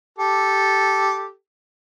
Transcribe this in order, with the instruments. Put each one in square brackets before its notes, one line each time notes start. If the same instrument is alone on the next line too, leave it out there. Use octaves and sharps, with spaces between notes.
[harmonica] G4 A4